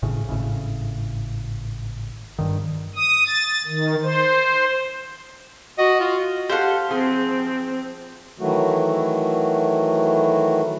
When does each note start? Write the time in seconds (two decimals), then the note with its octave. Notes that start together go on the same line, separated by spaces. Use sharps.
0.02 G#1 A2 C#3
0.29 G#1 A2 C#3
2.39 G2 D#3
2.96 D#6
3.26 A6
3.67 D#3
4.03 C5
5.78 F#4 D#5
6.00 F4
6.49 G4 A4 C5 F5 F#5
6.91 F3 C4 G#4 G#5
8.40 D#3 E3 F#3 A3 F#4